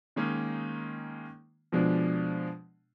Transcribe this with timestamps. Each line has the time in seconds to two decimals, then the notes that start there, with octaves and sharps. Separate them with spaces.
0.16 D#3 G#3 A#3 C#4 D#4
1.72 B2 F3 G#3 D4